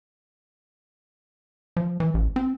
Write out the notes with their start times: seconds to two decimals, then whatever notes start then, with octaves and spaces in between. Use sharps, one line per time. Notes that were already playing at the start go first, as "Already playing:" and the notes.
1.77 F3
2.00 E3
2.14 A1
2.36 C4